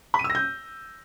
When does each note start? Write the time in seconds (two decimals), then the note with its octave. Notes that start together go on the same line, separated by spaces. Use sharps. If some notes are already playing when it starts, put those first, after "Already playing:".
0.14 B5
0.19 D#7
0.24 E6
0.30 A#6
0.35 G6